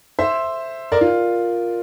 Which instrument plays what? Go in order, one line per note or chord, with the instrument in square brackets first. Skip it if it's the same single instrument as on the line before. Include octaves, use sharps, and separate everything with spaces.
[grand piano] C5 E5
A#4 D5
F4